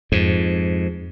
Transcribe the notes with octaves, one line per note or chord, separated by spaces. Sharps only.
F2 G#2